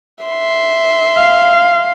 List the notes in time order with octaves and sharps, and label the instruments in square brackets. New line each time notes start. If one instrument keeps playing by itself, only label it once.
[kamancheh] E5 C6
[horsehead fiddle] F5